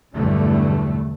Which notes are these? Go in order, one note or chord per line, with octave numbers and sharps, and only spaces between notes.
B1 E2 G2 D3 A3